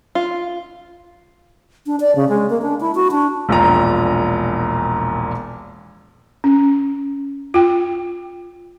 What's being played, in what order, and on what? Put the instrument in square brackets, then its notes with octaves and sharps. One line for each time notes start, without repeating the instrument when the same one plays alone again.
[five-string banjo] F4
[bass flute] D4
D5
C#3
G#3
A#3
D4
E4
F#4
D4
[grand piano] E1 A#1 A#2 A#5
[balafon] C#4
F4 G5